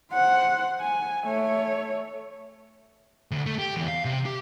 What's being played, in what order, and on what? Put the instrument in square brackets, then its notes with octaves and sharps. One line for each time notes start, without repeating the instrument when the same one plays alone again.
[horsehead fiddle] C5 F#5
G#5
A3 C#5
[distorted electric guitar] D2
A3
G4
E2
F5
C3
G4